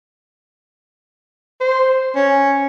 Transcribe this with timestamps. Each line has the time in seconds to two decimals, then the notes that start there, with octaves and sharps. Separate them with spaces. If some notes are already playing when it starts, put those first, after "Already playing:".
1.61 C5
2.16 C#4